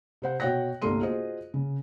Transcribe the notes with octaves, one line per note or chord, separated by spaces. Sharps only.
C3 C5 F#5
B2 F#4 C#5 G5 F#6 A#6
G1 C2 A3 A#3 C6 D#7
F4 F#4 G#4 C5 D#5
C#3